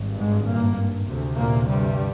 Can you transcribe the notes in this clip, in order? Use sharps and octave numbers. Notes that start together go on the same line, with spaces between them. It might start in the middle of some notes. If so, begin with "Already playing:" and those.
Already playing: G#1 G2
G#2 G#3
A#2 A#3
D2 C3
A#2 A#3
G2 G3